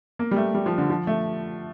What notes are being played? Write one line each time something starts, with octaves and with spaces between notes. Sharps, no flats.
A#3
G3
A3
G3
F3
D3
F3
A3